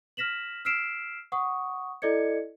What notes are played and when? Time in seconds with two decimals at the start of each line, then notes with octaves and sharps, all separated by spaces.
0.17 F6 A#6 B6 E7 F#7
0.65 E6 F6 B6 C7 D7 E7
1.32 F#5 C#6 D#6
2.02 E4 A4 D5 D#5 G#6 C#7